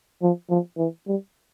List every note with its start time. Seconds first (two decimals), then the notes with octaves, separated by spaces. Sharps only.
0.22 F3
0.50 F3
0.78 E3
1.07 G3